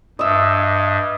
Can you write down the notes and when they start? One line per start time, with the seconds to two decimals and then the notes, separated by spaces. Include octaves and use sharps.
0.19 G2 D#5 E5